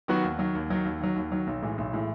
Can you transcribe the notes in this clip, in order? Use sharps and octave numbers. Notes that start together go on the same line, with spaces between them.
D#3 F#3 B3 F#4
D#2
D#3 F#3
D#2
D#3 F#3
D#2
D#3 F#3
D#2
D#3 F#3
B1
A2 E3 G#3
B1
A2 E3 G#3